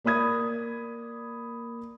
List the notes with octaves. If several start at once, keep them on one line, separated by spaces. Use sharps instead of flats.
A#3 D5 B5 D#6 G#6